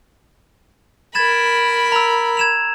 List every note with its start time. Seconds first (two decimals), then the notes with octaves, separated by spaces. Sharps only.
1.15 A#4 B5 G#6 A6 E7
1.92 A#5 E6
2.37 G#6 E7 F7